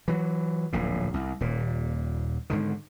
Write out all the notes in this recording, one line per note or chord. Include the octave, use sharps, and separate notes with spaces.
E3 F#3
D1 A#1 A2
C2
D#1 A#2
G#2 D3 D#3